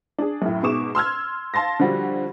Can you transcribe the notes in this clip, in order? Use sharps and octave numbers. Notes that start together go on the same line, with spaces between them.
D4 G#4
F#2 A2
G#2 B2 G#4 C#6 D6 E7
C6 E6 F6 G#6
F5 A5 C6 A6 A#6
D3 F3 G3 F#4